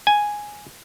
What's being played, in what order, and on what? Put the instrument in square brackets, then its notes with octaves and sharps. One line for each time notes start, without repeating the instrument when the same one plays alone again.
[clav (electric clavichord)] G#5